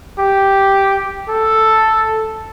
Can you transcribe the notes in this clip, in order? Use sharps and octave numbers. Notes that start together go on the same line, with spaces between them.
G4
A4